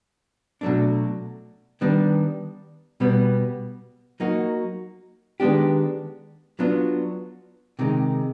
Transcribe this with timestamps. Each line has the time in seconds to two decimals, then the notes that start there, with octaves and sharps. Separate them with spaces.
0.61 B2 F#3 A3 D4
1.81 D#3 G3 B3 D4
3.00 B2 G3 B3
4.20 F#3 A#3 D#4 F#4
5.40 D#3 G#3 B3 D4 G4
6.59 F#3 B3 D4 F4
7.79 C3 D#3 G#3